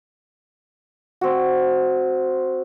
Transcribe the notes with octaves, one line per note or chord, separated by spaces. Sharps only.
C4 F#4